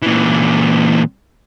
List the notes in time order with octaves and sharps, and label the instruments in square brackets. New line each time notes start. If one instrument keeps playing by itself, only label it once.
[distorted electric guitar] A#2 E3